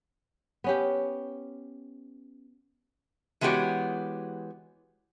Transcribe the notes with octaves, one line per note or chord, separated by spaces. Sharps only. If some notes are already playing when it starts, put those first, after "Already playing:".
B3 C#4 G4
E3 G#3 B3 F#4 G4 C#5